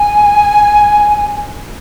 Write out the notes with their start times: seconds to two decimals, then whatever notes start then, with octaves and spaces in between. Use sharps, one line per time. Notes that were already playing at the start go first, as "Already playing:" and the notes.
Already playing: G#5